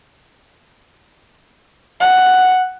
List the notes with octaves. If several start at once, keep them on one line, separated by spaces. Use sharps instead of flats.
F#5